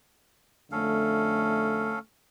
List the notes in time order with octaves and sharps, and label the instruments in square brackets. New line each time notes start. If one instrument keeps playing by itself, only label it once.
[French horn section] F2 D3 A3 [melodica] C#4 A4 F5